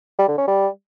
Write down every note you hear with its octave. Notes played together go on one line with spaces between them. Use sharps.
G3
D3
C#4
G3